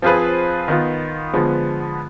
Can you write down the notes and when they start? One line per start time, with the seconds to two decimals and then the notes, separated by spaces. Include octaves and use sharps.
0.02 F3 C4 F4 G#4 B4
0.68 D#3 B3 F4
1.33 D3 F3 G#3 B3